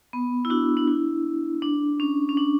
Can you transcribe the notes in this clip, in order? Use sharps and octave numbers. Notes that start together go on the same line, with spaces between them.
B3
E4
D4 F#4
D4
E4
D4
C#4
C#4
D4